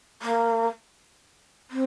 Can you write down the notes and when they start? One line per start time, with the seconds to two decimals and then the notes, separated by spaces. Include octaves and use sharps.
0.22 A#3
1.70 C4